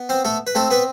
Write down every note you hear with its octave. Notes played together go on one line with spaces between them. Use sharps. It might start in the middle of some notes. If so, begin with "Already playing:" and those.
Already playing: B3
C4 C5
A3 A4
B4
A3 C4 A4
B3 B4